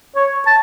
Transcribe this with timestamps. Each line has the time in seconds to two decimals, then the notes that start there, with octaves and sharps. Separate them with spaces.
0.16 C#5
0.47 A5